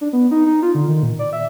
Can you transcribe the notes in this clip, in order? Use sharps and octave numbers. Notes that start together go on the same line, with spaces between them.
D4
B3
D#4
D#4
F4
D3
D#3
A#2
D5
E5